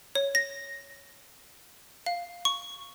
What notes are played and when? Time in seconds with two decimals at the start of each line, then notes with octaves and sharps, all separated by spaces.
0.15 C#5
0.35 A#6
2.06 F5
2.45 C#6